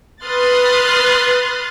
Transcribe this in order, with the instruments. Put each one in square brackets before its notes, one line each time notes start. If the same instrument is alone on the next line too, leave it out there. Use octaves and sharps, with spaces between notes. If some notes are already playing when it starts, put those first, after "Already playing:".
[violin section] B4 C6 D#6 F6 F#6 A6